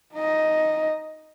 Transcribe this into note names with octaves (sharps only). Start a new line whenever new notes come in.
D#4 D#5